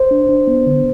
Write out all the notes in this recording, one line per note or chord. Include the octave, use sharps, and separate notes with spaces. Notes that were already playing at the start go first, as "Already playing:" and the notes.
Already playing: C5
D4
D4
B3
D3